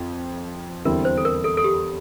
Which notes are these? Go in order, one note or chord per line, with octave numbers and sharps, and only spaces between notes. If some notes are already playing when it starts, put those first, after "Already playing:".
Already playing: F2
E2 D3 G3 C4 E4 A#4
C5
A4
A#4
A4
A4
G4